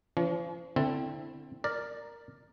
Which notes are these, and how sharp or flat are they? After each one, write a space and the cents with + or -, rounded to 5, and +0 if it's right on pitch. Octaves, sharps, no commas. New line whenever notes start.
F3 -35 C#4 +40
D3 +0 C4 +0 E4 +0
A#4 +0 D5 +0